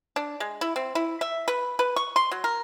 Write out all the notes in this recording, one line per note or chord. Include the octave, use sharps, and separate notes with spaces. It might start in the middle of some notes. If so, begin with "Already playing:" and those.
D4
G#3
E4
C4
E4
E5
B4
B4
C#6
C6
F#3
A#4